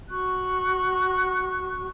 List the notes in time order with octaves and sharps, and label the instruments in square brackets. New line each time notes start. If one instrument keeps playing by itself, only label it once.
[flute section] F#4 C#6 F#6